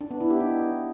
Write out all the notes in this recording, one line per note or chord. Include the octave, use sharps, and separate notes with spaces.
D4
B3
E4
G4
D#4